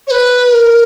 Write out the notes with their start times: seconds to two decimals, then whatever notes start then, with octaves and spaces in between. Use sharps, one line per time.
0.07 C#5
0.11 B4
0.52 A#4